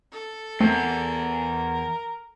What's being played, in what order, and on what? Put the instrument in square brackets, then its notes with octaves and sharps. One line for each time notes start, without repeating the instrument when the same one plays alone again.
[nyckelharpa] A4
[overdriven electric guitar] E2 [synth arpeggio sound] A3 C4 [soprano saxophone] A#4